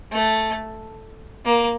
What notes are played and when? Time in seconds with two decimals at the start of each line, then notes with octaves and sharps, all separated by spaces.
0.12 A3
1.45 A#3